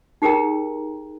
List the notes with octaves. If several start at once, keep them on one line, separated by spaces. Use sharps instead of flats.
D#4 G4 G#4 A#4 G5 A#5